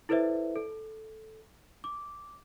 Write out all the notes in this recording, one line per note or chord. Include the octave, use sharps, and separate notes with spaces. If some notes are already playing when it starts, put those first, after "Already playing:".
E4 A4 B4 C5 D5 E5
A4
D6